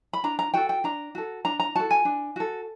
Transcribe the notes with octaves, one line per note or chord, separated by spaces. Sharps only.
B5
D4 A#5
A#5
F#4 A4 G5
G5
D4 A#5
F#4 A4
D4 A#5
A#5
F#4 A4 A5
G#5
D4
F#4 A4